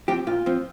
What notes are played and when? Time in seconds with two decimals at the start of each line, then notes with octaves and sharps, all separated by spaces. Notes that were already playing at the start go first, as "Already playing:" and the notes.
0.08 F3 C4 G4
0.27 A#2 F4
0.46 F3 C4